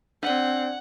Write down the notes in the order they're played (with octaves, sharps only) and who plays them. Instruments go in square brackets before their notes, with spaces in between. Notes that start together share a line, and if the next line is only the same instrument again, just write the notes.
[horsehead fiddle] C4 [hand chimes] D4 D5 [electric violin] F#5